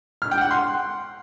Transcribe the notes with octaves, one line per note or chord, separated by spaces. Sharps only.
F6
G5
F#5
C6